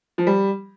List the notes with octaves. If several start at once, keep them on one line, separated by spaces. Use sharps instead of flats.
F3
G3